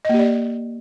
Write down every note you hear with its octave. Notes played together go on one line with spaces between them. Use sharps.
A#3 G4 D5 D#5